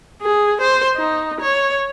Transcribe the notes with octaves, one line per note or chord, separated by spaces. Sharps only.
G#4
C5
D#4
C#5